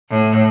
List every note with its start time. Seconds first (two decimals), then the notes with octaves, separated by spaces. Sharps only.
0.10 A2